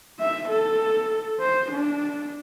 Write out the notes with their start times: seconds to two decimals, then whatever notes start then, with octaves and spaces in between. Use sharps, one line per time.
0.20 E5
0.49 A4
1.39 C5
1.72 D4